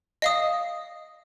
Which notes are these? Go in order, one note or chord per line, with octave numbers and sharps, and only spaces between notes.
D#5 F5 D#6